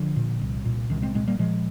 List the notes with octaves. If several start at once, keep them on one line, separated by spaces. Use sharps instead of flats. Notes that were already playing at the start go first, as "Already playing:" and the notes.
Already playing: D3 F3
A#2
C2
A#2
C2 D#3
G#3 C4
A#2 G#3 C4
G3 A#3
A#2 F3 G#3